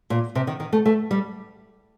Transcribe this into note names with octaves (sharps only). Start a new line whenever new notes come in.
A#2
C3
D#3
D#3
A3
A3
G3